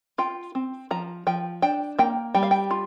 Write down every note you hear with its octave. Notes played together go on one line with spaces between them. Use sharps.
F4 G5
C4
F3 A#5
F3 G5
D4 G5
A#3 G5
G3 G5
F5
G5
F4